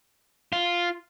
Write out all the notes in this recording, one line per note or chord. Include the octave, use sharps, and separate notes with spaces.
F4